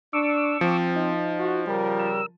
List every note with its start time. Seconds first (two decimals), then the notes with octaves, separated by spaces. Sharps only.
0.13 D4 C#6 D6 E6
0.61 F3 C4
0.96 D#4
1.38 F#4
1.68 C#3 G3 A#4
1.99 E6